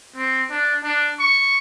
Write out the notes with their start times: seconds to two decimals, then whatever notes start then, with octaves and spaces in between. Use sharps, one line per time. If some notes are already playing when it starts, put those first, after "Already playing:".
0.15 C4
0.50 D4
0.83 D4
1.19 C#6